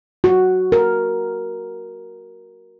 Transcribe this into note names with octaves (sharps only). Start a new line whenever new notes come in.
F#4
A#4